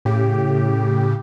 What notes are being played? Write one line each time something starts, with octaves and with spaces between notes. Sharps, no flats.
A2 C#3 G4